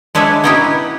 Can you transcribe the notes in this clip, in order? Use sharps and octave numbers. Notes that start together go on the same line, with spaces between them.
G#3 D4 B4 C#5 E5
B3 C#4 D#4 E4 G4 B4